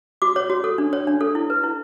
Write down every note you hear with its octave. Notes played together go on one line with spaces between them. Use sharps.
F#4 D6
C#5
F#4
A4
D4
C#5
D4
A4
E4
B4
E4